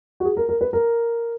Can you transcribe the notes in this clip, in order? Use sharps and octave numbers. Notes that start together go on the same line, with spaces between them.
F#4
G#4
A#4
A#4
B4
A#4